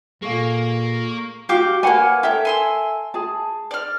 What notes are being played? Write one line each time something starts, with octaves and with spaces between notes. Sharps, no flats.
A#2 A#3 G#4 A4 F5 C#6
F#4 G4 F5 G5 D6
A#3 B4 C#5 F#5 G#5
A4 A#4 C#5 E5 G5
G#5 C6 E6
G#4 A5
D5 F6